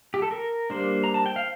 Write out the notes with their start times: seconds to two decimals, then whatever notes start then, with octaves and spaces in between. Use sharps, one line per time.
0.14 G4
0.22 A4
0.31 A#4
0.70 G3 A#3 D4 C5
1.04 A#5
1.14 A5
1.26 G5
1.36 F5